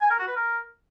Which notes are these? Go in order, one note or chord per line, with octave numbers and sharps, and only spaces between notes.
G#5
A#4
F#4
B4
A#4